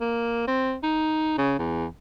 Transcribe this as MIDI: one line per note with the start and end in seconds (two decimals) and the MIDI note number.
0.01 0.45 58
0.48 0.76 60
0.83 1.37 63
1.38 1.54 49
1.59 1.87 40